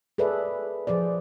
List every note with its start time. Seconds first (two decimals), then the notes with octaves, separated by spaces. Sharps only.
0.18 G#4 A4 B4 D5 E5
0.87 F3 G#4 C5 D5